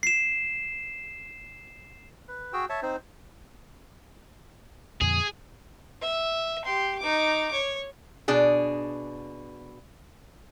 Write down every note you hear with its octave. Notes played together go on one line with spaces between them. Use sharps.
C7 E7
B4
F#4 G#4 G5 E6
C#5 E5 A5
C4 D#4 C5
F2 A#2 D3 G#4
E5
G4 C6
D#4 D6
C#5
B2 D4 G#4